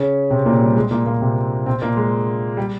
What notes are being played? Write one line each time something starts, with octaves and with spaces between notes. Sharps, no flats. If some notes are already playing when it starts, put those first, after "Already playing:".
Already playing: C#3 C#4
C3 C4
A#2 A#3
G3
G#3
A#2 A#3
A#2 A#3
C3 C4
C3 C4
A#2 A#3
G#3
G3